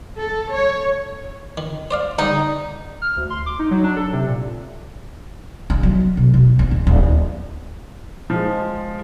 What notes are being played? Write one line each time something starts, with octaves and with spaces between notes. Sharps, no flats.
A4
C#5
D#3
C5 D5 F5
D3 G3 D#4
F6
D2
C6
D6
D#4
F#3
D4
A4
C3
A#2
D#3
F#3
B2
B2
D2
D1
D1
F3 G#3